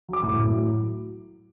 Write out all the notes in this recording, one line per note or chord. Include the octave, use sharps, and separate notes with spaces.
F#3 D6
A2
A2
F#3